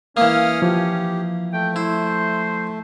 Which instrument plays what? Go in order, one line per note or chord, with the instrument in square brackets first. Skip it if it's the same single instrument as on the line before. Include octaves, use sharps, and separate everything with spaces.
[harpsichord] E3 A#3 [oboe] C#4 [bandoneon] F5 D#6 F6
[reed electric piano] F3 [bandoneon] G4
[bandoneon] A3 [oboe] G5
[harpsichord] E4 [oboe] C5